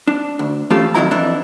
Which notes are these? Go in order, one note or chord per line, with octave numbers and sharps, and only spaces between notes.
D4
D2
E3 A3 C#4 F4 G4 A4
F2 D#3 F3 F#3 E4 A#5
F2 E3 D4